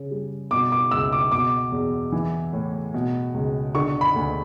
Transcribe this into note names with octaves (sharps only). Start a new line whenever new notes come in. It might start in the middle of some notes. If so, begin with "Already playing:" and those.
Already playing: C#3
G3
B2 D6
D6
C#2 E6
D6
B2 D6
E2
E3
A2
B2
C#2
D3 C#6
B5
D2